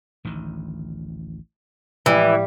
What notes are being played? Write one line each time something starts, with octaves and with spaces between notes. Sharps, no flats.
A1 D2 D#3
A2 E3 F3 G3 G#3